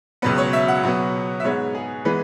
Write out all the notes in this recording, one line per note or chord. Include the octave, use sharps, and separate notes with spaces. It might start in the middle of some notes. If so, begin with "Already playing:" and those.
C#2 B2 F#3 B3 B4
C#5
E5
F#5
B2 F#3 B3
E5
G#2 G#3 B3 C#5
G#4
E3 G#3 B3 B4